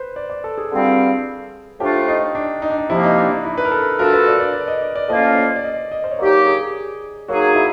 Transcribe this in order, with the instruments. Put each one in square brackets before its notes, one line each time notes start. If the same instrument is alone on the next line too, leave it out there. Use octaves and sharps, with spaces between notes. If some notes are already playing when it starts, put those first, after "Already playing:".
Already playing: [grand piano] B4 C5
D5
D5
A4
G#4
[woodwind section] G2 D3 G3 C4 F4
[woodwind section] A2 F3 A3 D4 F4 [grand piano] G4
[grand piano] D#4
D4
D#4
D4
D#4
[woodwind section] C3 F3 A#3 [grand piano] E4
[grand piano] D#4
D4
D#4
E4
B4
A#4
A4
[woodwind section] F3 A3 D4 F#4 A4 [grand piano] A#4
[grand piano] B4
D5
D5
D5
D#5
D5
D5
[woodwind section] A2 F3 A#3 C#4 F4 [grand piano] D#5
[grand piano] D5
D5
D#5
D#5
C5
C#5
[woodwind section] F#3 A#3 D#4 G4 [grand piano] D5
[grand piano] G#4
[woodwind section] F#3 A#3 D#4 G#4 [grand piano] F#4
[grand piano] E4